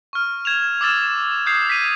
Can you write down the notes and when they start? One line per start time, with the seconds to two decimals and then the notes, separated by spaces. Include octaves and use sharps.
0.13 C#6 F6
0.45 G#6 E7 F7
0.81 D6 E6 F6 A6 E7
1.46 D#6 G6 G#6 C7
1.70 B6 D#7